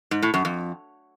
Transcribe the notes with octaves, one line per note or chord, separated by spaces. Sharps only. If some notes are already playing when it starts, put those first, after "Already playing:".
G#2
A2
F#2
F2